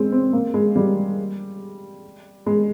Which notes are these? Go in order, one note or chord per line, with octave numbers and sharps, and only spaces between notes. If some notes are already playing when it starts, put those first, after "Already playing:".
Already playing: G#3 C4
C4
A#3
G#3
G3
G#3